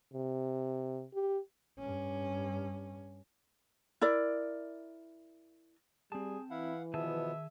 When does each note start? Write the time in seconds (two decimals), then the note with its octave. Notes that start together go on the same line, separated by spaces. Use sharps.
0.14 C3
1.14 G4
1.79 G2 C#4
4.01 E4 A#4 D5
6.12 G3 C4 G#4 A5
6.50 E3 E4 F5 F#5
6.94 B2 D#3 F3 B3 G#4 E5 A5